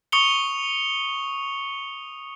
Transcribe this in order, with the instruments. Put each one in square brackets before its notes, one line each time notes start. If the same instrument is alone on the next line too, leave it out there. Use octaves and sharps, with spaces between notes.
[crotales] C#6 D#6 C#7 F7 G7